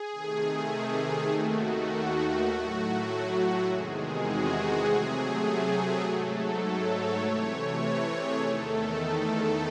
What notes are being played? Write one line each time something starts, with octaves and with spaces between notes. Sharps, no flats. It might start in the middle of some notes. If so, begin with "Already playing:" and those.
Already playing: G#4
C3 D#3 A3
D#2 D#3 A3 F#4
A2 F#3 A3
E2 C3 D#3 G#3 G#4
F#4
C3 F#3 A3 G#4
G#2 F#3 A3 A4
C#5
C3 E3 A3
C#5
G#4
E2 D#3 A3 A4
A4